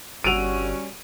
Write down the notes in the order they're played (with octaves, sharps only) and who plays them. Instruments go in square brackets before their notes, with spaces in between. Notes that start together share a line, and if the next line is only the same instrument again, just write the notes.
[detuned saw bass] G1 [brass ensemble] G3 C#4 [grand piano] F#4 E6 D7 [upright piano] D#7 F7